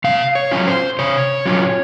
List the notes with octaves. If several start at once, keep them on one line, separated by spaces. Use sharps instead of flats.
C3 F5
C#5
F#3 C#4 F4
C5
C3 C#5
F#3 C#4 F4